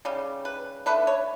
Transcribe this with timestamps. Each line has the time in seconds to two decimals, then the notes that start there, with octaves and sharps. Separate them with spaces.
0.05 C#3 G3
0.45 B4
0.86 D3 A3 B4
1.07 C#5